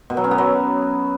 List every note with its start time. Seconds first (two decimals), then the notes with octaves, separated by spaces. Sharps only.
0.10 B2
0.17 F#3
0.24 C#4
0.31 B3
0.38 F#3